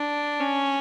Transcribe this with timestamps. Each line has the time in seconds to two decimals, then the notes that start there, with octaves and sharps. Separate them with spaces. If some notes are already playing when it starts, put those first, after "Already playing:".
Already playing: D4
0.40 C#4